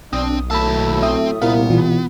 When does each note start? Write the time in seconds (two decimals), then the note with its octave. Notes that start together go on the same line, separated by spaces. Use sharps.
0.13 B1 C4 D4 D#6
0.51 D#2 A2 F#3 A3 A5 B5 E6
1.03 C4 E5 D#6
1.42 C2 A#2 B3 E4 A#4 F5
1.70 B2 E3 F4